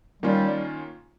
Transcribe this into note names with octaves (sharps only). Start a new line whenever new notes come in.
D#3 G3 A#3 C#4 F4